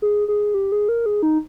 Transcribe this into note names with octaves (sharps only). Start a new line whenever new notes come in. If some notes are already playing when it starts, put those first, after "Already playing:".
G#4
G#4
G4
G#4
A#4
G#4
D#4